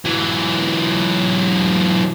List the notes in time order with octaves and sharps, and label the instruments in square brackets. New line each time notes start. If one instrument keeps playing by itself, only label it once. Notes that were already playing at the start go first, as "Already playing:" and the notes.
[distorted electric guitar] E3 F#3